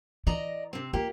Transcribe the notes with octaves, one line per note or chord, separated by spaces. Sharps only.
E3 D5 D#5 A#5
C3 C4
A#3 F4 G4